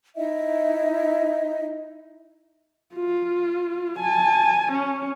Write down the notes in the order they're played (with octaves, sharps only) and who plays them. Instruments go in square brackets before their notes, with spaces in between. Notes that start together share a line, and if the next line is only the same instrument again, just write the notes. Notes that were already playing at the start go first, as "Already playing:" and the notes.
[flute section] D#4 E4 D#5 E5
[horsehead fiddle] F4
G#5 A5
C#4